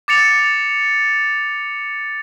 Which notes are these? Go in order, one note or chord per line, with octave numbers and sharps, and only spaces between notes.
D6 A6 C#7 F7